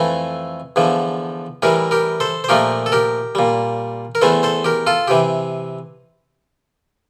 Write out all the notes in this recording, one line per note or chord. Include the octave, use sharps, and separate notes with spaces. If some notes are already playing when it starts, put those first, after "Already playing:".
Already playing: F2 E3 A3
E2 D3 F3
A2 E3 G3 G4 A#4
G4 A#4
A4 C5
C5
A#2 F3 A3 G4 A#4
A4
G4 A#4
A#2 G3
A#4
E2 E3 A3 A4 C5
A4 C5
G4 A#4
F4 A4
C3 E3 G4